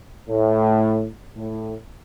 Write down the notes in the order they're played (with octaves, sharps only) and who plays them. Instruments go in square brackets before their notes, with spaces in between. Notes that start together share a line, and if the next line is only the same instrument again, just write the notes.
[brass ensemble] A2
A2